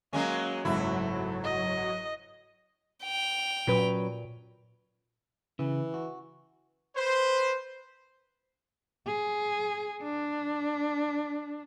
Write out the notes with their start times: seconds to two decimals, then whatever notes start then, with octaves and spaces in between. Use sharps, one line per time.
0.13 F#3 G#3 A#3 C#4
0.65 F#1 G#2 F#3 A3 E4
1.44 D#5
3.04 G5 F7
3.67 A#2 F#3 C#4 B4
5.59 C#3 E3
5.94 F#4
6.94 B4 C5
9.07 G#4
10.03 D4